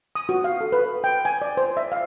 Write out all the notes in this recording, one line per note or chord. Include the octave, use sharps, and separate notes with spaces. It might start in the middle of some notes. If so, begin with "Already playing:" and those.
D#6
F#4
F5
A4
B4
G5
G#5
D5
C5
E5
F5